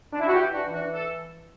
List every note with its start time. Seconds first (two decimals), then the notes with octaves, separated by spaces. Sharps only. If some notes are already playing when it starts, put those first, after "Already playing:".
0.13 D4
0.20 E4
0.27 F#4
0.34 E3 E4 G4
0.53 D4 F#4
0.64 E3
0.73 D4 F#4
0.92 A4